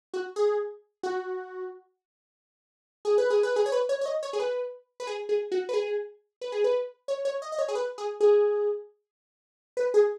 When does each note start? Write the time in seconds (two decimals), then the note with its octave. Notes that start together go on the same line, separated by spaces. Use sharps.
0.14 F#4
0.36 G#4
1.03 F#4
3.05 G#4
3.18 B4
3.30 G#4
3.43 B4
3.56 G#4
3.66 C#5
3.72 B4
3.89 C#5
4.01 C#5
4.06 D#5
4.23 C#5
4.33 G#4
4.40 B4
5.00 B4
5.07 G#4
5.29 G#4
5.52 F#4
5.69 B4
5.74 G#4
6.41 B4
6.52 G#4
6.64 B4
7.08 C#5
7.25 C#5
7.42 D#5
7.52 D#5
7.59 C#5
7.68 G#4
7.75 B4
7.98 G#4
8.20 G#4
9.77 B4
9.94 G#4